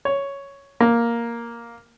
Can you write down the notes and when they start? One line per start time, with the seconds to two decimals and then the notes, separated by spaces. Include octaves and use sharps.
0.05 C#5
0.80 A#3